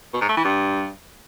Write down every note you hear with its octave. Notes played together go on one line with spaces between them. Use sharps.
B2
G#2
A3
E3
G2